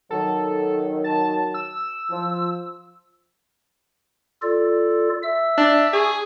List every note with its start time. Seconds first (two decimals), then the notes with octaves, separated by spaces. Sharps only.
0.11 D#3 F#3 A4
1.04 A5
1.54 E6
2.10 F3
4.42 F4 A4 D5
5.23 E5 E6
5.58 D4
5.93 G#4 C#6